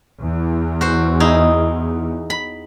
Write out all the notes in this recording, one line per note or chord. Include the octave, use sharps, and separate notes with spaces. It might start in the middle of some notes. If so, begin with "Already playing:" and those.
E2
F#4 C5
D#4 E4 G#4
B5